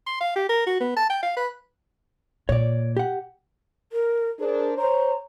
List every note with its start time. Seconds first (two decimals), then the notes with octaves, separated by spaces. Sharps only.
0.07 C6
0.20 F5
0.36 G4
0.49 A#4
0.67 F#4
0.81 B3
0.97 A5
1.10 G5
1.23 F5
1.37 B4
2.49 A#2 C#5 D5
2.97 G4 F#5
3.92 A#4
4.40 D4 G#4 A#4 C5
4.77 C5 C#5 A#5